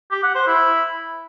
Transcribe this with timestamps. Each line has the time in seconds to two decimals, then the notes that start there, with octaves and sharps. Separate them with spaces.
0.11 G4
0.23 F#5
0.35 C5
0.47 E4